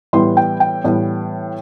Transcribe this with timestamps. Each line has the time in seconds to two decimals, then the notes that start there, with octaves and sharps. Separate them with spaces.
0.13 A2 E3 G3 B3 C6
0.37 G5
0.60 G5
0.84 A2 E3 G3 B3